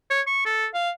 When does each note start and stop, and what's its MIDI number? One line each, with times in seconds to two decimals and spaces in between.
0.10 0.21 73
0.27 0.41 85
0.46 0.67 69
0.74 0.90 77